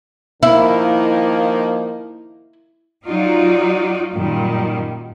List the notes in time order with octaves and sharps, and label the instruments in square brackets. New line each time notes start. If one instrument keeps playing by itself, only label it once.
[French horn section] D#3 F3 A#3 [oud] E4
[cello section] F#3 D#4 F4 F#4 D5
F#2 A#2 D#3 G3